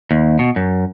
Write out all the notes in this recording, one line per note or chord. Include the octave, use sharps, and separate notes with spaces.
D#2
B2
F#2